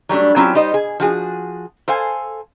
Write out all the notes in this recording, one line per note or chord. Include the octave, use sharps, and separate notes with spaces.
F#3 G3 A3 D4
F#3 C4 C#4 E4 F4 G4
G3 D#4 C5 D#5
G#4
F3 F#4 G#4
A4 C5 F5 G#5